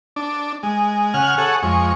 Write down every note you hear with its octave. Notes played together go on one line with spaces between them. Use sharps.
D4
G#3
C#3 F#5 G#5 F6
G#4 A4 C#5 F#5
F2 G#3 C#6